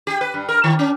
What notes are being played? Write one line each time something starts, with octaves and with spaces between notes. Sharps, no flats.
G4
B4
G2
A#4
D#3
C#4